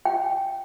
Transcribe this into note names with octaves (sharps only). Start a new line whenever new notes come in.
G5